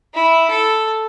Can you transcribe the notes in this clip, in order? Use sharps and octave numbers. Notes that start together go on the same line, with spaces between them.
E4
A4